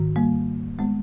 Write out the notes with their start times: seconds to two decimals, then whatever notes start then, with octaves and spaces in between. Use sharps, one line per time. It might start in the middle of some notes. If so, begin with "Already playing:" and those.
Already playing: G#2 D#3
0.16 G3 A#3
0.79 G#3 B3